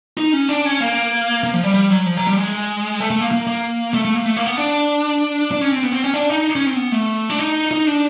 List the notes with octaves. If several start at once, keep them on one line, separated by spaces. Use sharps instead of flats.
D#4
C#4
D4
C#4
A#3
A#3
F3
G3
G3
F#3
F3
F#3
G3
G#3
A3
A3
A#3
A#3
A#3
A3
A3
A#3
A3
A#3
B3
D4
D4
C#4
C4
B3
C4
C#4
D4
D#4
C#4
C4
B3
A3
D4
D#4
D#4
D4